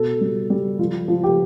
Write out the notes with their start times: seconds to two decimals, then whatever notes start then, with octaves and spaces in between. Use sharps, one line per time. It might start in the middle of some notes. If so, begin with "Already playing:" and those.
Already playing: B2 A4
0.21 G3
0.50 G3
0.79 F3 F4
1.08 F3
1.24 G4